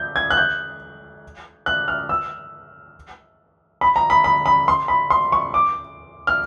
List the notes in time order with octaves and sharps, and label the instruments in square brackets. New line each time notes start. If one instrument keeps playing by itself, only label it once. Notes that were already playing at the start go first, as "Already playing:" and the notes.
Already playing: [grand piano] G6
G#6
F#6
G6
F#6
F6
E6
B5
A#5
B5
B5
B5
C6
B5
C6
C#6
D6
F6